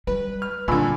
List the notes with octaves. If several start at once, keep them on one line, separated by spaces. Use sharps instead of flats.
G3 B4
F6
A#2 D3 G3 G#5 B5 E6